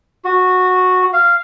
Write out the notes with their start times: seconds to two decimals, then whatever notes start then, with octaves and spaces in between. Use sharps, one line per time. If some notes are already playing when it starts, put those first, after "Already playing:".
0.25 F#4
1.13 F5